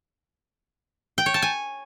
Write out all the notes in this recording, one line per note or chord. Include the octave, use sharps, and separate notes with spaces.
G5
C#5
A5
G#5